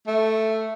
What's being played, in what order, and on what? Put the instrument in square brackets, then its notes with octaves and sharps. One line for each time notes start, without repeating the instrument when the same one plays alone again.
[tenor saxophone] A3